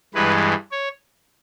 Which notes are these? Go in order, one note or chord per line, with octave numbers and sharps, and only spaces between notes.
G2 E3 G#3 B4
C#5